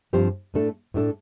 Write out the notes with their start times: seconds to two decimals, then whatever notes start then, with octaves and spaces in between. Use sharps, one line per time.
0.13 G2 F3 C4 G4 C5
0.54 A2 A3 D4 A4
0.94 A2 A3 D4 A4